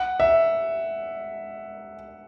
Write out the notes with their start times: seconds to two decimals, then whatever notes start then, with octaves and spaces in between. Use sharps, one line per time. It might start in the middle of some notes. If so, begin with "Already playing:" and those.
Already playing: F#5
0.20 E5